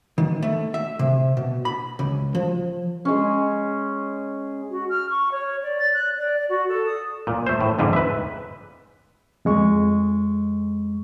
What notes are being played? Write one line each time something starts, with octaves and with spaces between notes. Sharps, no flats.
D#3
A3
E5
C3
B2
B5
C#2
F3
G#3 C#4
F#4
F6
C#6
C#5
D5
A6
F#6
D5
D5
F#4
A4
D#6
A#2
A3 C5
A2
F2 G#2 D3
B4 E5
F2 G#3 C#6